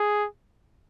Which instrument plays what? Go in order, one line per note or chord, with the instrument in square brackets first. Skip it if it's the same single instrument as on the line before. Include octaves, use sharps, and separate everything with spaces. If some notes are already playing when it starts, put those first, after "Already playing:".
Already playing: [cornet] G#4